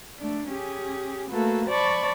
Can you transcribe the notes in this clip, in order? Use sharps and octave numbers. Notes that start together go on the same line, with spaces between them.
A3 D4
C#4 G4 G#4
A3 A#3 F#4 A4 B4
C5 D5 A5 B5 C#6